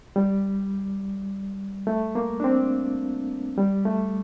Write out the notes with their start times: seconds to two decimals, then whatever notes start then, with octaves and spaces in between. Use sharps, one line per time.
0.16 G3
1.87 A3
2.15 A#3
2.40 D4
2.44 C4
3.58 G3
3.85 A3